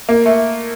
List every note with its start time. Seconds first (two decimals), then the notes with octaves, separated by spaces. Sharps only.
0.09 A#3
0.26 A3